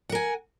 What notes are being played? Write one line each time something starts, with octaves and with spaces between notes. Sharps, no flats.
A#4 F#5 G#5